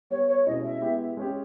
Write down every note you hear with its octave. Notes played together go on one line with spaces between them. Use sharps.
G3 B3 G4 C#5
C#5
B2 G#3 C#4 E4 G#4 D#5
E5
G#3 B3 E4 G4
G#3 C#4 G4